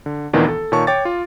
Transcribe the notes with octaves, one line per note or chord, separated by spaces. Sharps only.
D3
D2 A#2 D#3 E3 B3 D4
A4
A#2 D#3 C#5 A5 C#6
C#5 G5 D6 A6
F4